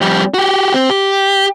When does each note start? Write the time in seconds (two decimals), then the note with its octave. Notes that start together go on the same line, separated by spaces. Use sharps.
0.01 F2 G3
0.34 F#4 G4
0.74 C4
0.90 G4